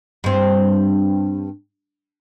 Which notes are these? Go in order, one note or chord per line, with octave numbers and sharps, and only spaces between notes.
G2 C4